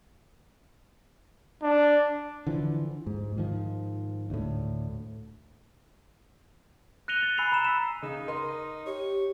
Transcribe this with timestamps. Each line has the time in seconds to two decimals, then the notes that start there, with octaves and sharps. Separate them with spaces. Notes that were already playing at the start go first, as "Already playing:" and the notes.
1.63 D4
2.47 D3 E3 F3
3.07 G#2
3.37 G#2 D#3 F3
4.30 D2 A2
7.08 F#6 A#6 C#7 D#7 F7 G7
7.23 A6
7.38 G#5 B5 E6 F#6 C7 F7
7.52 A#5 B5 F#6 E7
7.65 E6 B6 E7
8.02 C#3 D#4
8.28 A#4 D#5 C6
8.86 G4 C#5